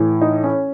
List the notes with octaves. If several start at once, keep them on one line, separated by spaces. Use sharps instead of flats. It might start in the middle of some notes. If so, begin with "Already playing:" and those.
Already playing: A2 E3
D#4
C#4